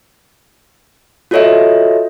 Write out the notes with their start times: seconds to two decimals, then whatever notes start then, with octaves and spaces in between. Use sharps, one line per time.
1.31 F4 F#4 A4 C#5 D#5 E5